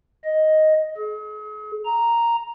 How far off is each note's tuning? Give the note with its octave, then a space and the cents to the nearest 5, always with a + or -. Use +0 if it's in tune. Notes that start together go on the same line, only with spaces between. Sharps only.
D#5 +5
G#4 +40
A#5 +0